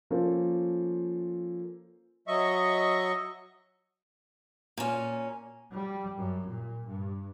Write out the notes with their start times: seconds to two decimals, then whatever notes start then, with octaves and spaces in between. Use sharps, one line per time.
0.10 F3 A#3 C#4 F4 A4 C5
2.28 F#3 D#5 E5 C#6
4.78 A#2 C#4
5.73 G3
6.17 F#2
6.49 A#2
6.87 G2